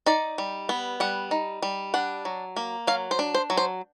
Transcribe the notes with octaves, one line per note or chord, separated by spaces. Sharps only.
D#4 D5
G3
B3
G3 F#5
D#4
G3
D4 F#5
F#3
A#3
F#3 F5
C5
D4
C5
F#3
C5